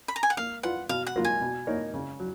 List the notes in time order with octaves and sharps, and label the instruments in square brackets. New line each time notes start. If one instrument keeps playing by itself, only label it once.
[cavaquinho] B5
A#5
G#5
F#5
[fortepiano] A#3 [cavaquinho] F5
[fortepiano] F4 B4 [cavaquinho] F#5
[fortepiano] B2 [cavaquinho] F5
[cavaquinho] F#5
[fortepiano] F#3 A#3 F4
[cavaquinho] G#5
[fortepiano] B2
A#3 D#4 A#4 C#5
C#3
F#3